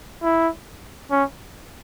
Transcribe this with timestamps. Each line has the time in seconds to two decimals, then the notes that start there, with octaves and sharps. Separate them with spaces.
0.23 E4
1.11 C#4